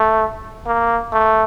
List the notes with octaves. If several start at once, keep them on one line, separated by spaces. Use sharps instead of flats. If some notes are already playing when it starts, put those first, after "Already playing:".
Already playing: A3
A#3
A3